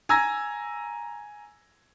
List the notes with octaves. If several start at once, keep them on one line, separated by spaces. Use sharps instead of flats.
G#5 A#5 E6 G#6 A#6